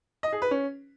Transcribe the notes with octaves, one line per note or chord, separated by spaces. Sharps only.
D#5
G#4
B4
C#4